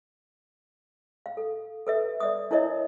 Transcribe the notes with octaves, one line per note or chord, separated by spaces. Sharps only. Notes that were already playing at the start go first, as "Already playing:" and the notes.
F5
A4
A4 B4 E5
D5 E5 D#6
D4 E4 A#4 C#5 D#5 E5